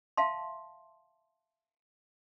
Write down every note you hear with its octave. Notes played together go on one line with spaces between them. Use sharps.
E5 F5 A5 C6